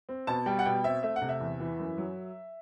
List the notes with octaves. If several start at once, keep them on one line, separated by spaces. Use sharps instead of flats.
C4
B2 A5
G3 G5
F#5
B2 G5
C4 E5
A3 E5
F#5
C3
E5
E2
E3
F#2
F#3